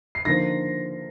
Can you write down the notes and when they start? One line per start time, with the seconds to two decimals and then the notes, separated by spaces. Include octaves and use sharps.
0.15 C7
0.25 D3 F3 A#3 D#4 A#6